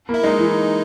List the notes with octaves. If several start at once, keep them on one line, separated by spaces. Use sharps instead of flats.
A#3
E4
G#3 D#4
E3